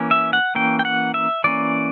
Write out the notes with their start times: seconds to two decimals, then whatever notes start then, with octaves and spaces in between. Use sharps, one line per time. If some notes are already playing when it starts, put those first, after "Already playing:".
Already playing: E3 A#3 C#4
0.11 E5
0.33 F#5
0.55 E3 A#3 C#4 G5
0.79 G5
0.85 F#5
1.14 E5
1.44 E3 A#3 C#4 D5